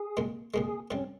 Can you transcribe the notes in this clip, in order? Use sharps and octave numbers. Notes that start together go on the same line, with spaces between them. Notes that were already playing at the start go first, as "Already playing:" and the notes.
Already playing: G#4
C2 A#2 G#3
C2 A#2 G#3 G#4
C2 C3 G3 C#4